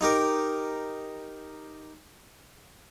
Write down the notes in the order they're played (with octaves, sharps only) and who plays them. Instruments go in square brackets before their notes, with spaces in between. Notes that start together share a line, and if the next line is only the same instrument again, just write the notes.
[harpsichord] D#4 G4 A#4